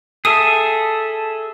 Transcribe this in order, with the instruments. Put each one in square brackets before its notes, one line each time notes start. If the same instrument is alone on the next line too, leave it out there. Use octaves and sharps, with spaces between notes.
[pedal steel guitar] G#4 A4 E5 [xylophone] D#6 D#7